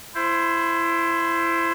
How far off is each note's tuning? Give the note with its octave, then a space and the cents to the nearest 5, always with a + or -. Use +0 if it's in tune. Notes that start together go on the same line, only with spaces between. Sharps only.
E4 +25 C5 +0